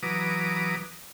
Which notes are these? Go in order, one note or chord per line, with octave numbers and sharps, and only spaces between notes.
E3 F#3 B4 A#5 D6 D#6